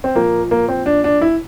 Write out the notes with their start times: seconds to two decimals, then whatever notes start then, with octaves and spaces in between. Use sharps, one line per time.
0.04 C4
0.16 A#2 F3 A#3
0.51 A#3
0.69 C4
0.86 D4
1.04 D4
1.21 E4